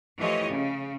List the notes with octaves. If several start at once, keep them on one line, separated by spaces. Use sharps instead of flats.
E3 F3 A3 G4 C#5 D#5
C#3